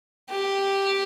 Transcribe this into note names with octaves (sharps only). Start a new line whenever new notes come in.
G4